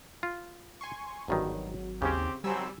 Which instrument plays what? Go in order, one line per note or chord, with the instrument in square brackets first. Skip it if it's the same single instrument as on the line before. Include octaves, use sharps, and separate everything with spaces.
[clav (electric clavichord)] F4
[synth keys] G#5 C6 C#6
[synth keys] G#1 F#3 [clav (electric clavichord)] E2 G2 D#3
[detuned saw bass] D#2 [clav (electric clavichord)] C#3 C#4 [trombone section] C4 G4
[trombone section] G#1 F#3 C4 [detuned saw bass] G3 [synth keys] G#5 E6